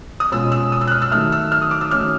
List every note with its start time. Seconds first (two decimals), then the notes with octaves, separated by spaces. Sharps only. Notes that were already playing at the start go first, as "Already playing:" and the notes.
0.20 D#6
0.32 B2 G#3 C#4 F4 E6
0.52 E6
0.72 D#6
0.81 E6
0.87 F#6
0.92 F6
1.02 E6
1.11 D#3 F#3 A3 F6
1.32 E6
1.52 F6
1.62 D#6
1.71 D6
1.81 E6
1.91 D#3 F#3 A3 C#4 F6